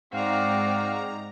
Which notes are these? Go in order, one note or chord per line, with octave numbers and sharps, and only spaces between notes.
G#2 C4 F#4 D5 F5 A#5